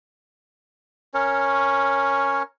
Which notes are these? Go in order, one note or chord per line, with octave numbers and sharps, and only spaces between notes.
C#4 A#4 C#5